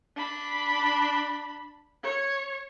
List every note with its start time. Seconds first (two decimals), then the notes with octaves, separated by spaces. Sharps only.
0.16 D4 B5
2.03 C#5